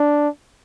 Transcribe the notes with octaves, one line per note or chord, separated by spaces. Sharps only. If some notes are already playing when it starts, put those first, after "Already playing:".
Already playing: D4